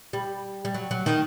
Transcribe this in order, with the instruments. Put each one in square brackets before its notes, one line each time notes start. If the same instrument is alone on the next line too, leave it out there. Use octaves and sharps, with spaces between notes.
[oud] G3
G3
F#3
F#3
D#3